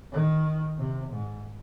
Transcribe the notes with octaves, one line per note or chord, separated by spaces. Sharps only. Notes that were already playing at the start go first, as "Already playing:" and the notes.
D#3
C3
G#2